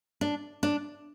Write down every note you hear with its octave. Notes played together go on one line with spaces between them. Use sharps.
D4
D4